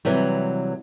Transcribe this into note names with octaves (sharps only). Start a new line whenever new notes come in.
C3 E3 F#3 G3